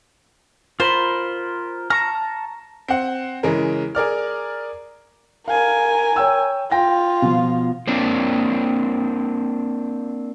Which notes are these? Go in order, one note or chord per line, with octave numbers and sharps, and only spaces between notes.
F4 A#4 C5 B5
A5 A#5 C#6 F6
C4 F#5
C#3 E3 G#3 A#4
G#4 A#4 D5 F6
A#4 F5 G#5
C#5 G5 E6
F4 G5 A#6
B2 F3
A#3 C4 D4